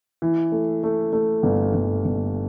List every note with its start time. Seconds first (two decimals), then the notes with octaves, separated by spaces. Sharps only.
0.22 E3
0.52 A3
0.83 A3
1.13 A3
1.43 G1
1.74 G1
2.05 G1